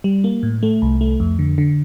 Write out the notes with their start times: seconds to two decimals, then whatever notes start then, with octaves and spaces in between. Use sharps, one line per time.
0.04 G3
0.24 A#3
0.43 A2
0.63 A3
0.82 C2
1.01 A3
1.20 F2
1.39 D3
1.58 D3